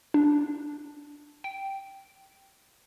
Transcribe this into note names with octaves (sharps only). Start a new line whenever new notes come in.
D4
G5